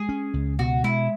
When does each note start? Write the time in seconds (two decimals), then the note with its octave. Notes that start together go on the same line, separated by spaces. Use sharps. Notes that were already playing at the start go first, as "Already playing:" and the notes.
Already playing: G#3 G#4
0.09 C#4
0.34 C#2
0.59 B2 F#4
0.84 G#3 E4